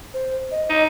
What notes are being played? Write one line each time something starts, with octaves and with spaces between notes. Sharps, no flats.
C5
D#5
D#4